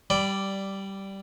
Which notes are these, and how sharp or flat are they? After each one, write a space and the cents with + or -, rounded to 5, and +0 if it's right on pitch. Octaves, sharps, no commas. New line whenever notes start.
G3 -10 D5 +0 B5 +15